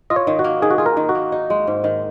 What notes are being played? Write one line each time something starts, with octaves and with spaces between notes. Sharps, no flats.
F4 D#5
C#5
D#3
F#4
A#3
D#3 G#4
F#4
F4 G#4
A#4
D#3
F#4
A#3
D#4
G#3
G#2
D#3